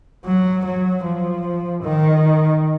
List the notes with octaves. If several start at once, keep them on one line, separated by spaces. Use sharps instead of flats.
F#3
F#3
F3
D#3